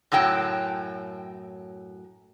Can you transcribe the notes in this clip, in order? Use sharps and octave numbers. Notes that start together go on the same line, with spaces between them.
F#2 A2 F#3 G5 A5